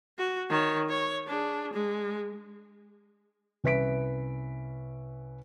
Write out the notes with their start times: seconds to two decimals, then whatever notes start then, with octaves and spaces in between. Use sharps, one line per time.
0.18 F#4
0.49 D#3 C#5
0.89 C#5
1.27 D4 G#4
1.73 G#3
3.64 C2 C#4 B4 E5 B6 D7